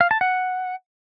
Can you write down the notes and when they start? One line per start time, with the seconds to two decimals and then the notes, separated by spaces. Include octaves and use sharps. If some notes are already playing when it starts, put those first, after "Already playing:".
0.01 F5
0.11 A5
0.21 F#5